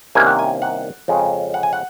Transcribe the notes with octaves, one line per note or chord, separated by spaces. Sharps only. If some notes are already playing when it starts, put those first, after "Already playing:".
C2 C3 D#3 A#3 C#4 G#5
F#5
G#5
F#5
F2 C#3 G#3 C#4
F#5
G#5
F#5